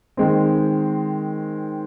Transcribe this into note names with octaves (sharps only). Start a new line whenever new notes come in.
D#3 G#3 C4